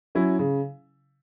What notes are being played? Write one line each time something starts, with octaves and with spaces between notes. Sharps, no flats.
F#3 C#4 E4
C#3